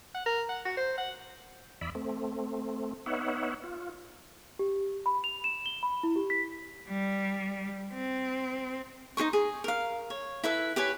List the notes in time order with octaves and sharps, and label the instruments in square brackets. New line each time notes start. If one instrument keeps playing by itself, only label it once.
[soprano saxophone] F#5
A#4
F#5
F#4
C5
F#5
[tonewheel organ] E2 D5 E5 B5
A3 C4
B3 D#4 C#5 E5 F#5
F4
[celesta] G4
B5
F7
E7
G7
B5
E4
G4
B6
[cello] G3
C4
[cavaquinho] D#4 G#4 C5 C#6
G#4
A#4 F5
C#5
E4 A4 B4 E5
G4 B4 C#5 G#5